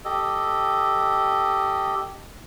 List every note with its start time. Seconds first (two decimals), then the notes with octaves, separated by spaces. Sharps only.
0.05 G4 A4 D#5